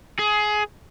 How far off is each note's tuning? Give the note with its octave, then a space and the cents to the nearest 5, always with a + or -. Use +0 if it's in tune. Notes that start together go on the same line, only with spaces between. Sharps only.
G#4 +20